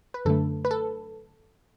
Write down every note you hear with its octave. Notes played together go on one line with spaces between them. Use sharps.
B4
F#2 D3 A3 A4
B4
A4